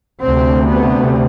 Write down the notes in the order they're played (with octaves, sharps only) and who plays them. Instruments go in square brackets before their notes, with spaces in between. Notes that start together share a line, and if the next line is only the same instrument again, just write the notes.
[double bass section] D2 C3 C4
B3